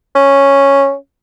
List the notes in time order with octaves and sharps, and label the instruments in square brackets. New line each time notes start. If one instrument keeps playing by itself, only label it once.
[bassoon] C#4